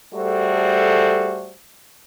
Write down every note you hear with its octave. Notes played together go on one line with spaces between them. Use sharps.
G3 A3 F#4 G#4 A4 C5